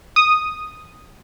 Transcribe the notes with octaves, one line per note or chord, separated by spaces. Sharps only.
D#6